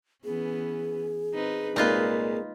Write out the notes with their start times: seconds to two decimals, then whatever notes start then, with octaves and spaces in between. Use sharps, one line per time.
0.24 E3 B3 C#4 G#4
1.34 C4 D#4 B4
1.76 C2 A#2 G#3 A#3 D#4 F4 B4